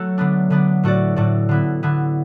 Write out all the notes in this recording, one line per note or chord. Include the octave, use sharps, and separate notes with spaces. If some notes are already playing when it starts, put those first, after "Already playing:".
Already playing: F#3 A3 F#4 A4
D3 B3 D4
D3 B3 D4
A2 A3 F#4 D5
A2 A3 F#4 D5
D3 B3 E4
D3 B3 E4